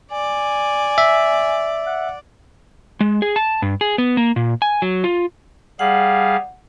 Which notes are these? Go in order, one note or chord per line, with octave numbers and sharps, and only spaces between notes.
D5 G#5
E5
F#5
G#3
G#4
A5
G2
G#4
B3
A#3
A#2
G#5
F#3
F4
G3 G#4 F5 F#5